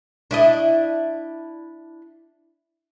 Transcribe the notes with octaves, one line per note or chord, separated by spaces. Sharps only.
D4 E4 D#5